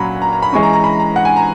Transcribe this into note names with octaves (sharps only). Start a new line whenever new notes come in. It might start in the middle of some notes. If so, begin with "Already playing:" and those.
Already playing: A#2 F#3 C#4 F#5 A#5 B5
A#5
A#5
B5
E3 G#3 C#4 C#6
A#5
A#5
B5
A#5
F#5
G#5
A#5